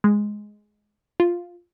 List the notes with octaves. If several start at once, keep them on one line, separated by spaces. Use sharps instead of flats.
G#3
F4